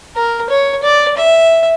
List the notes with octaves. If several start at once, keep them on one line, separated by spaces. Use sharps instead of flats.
A#4
C#5
D5
E5